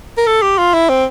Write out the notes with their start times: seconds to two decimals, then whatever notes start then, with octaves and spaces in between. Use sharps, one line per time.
0.18 A#4
0.27 A4
0.42 G4
0.58 F4
0.74 E4
0.89 C4